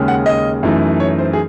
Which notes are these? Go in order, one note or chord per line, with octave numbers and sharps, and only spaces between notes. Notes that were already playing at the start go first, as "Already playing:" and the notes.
Already playing: D#2 C#3 G#3 C#4
F#5
D#5
F#2 E3 A3 D#4
C#5
C5
G#4